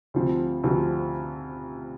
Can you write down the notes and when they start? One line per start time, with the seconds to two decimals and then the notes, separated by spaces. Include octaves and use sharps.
0.14 D2 C3 F3 C4
0.64 D2 C3 F3 C4